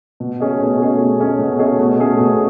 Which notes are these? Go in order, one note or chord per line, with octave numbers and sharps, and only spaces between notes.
B2
A3 C#4 G#4 D#5
B2
A3 C#4 G#4 D#5
B2
A3 C#4 G#4 D#5
B2
A3 C#4 G#4 D#5
B2
A3 C#4 G#4
B2